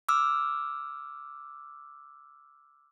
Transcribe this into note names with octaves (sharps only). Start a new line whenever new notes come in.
D6 E6 F6